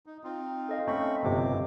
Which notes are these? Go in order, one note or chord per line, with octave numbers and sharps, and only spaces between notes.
D#4
C4 D#4 F4
A4 D#5 F5
A3 C4 C#4 B5 C#6
G1 A2 C3 D6